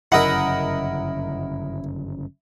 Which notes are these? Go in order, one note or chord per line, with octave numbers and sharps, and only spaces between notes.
G1 F#2 C#3 E4 A#4 D#5 E5 F#5